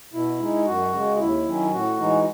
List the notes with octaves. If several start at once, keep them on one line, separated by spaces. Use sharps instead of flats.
B2 E4
G#3 D#4
F#2 F#4
C#3 G#3
D#2 E4
D#3 F#3 C#4
A2 F#4
E3 G#3 D#4